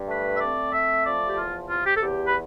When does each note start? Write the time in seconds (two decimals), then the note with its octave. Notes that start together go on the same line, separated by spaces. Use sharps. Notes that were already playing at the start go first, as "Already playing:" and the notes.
Already playing: G2
0.08 A3 B4
0.36 E5
0.40 C4 D5
0.73 A3 E5
1.05 F3 D5
1.28 G4
1.37 E2 F4
1.69 C3 F4
1.86 G4
1.96 A4
2.02 E2 G4
2.26 B4